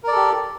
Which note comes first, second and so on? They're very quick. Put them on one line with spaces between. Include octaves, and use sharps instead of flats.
A#4 D5 A4 G4